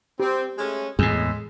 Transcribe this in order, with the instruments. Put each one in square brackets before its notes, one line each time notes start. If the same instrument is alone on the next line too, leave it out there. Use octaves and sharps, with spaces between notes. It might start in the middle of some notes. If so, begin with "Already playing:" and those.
[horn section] C4 [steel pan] G4
[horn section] G#3 A3 C#4
[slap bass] E2 A2 [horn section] G#3 [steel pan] G#4